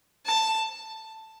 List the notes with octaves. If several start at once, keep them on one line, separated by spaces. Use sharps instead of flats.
A5